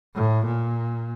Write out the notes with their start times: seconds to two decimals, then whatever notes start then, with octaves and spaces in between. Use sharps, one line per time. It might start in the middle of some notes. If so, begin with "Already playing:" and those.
0.15 A2
0.46 A#2